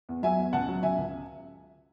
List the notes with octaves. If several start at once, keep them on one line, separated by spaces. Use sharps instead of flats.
E2
F#3 E5 G#5
E2
C#2 F#5 A5
F#3
C#2 E5 G#5
C#2